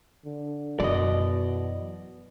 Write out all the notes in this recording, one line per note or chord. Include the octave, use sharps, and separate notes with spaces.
D3
F#2 B2 E3 D5 D#5